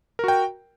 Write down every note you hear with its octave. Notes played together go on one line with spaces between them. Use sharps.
F#4 A#4 G5